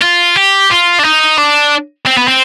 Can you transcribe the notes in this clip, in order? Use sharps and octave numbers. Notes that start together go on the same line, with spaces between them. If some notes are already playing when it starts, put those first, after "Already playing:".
F4
G4
F4
D4
D#4
D4
C4
B3
C4